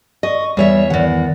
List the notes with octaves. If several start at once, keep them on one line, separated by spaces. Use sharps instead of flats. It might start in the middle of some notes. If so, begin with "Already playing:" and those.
D#5 C#6
E2 G3 C#5 E5
E2 D#3 F#5